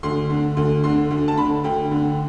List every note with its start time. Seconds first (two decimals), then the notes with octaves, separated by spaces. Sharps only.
0.03 D2 C6
0.30 D3
0.57 D2
0.84 D3 C6
1.11 D2
1.28 A5
1.38 D3 B5
1.64 D2 G5
1.91 D3